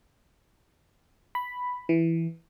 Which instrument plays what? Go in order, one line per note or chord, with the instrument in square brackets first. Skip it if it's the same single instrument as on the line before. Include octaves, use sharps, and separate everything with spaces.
[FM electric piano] B5
E3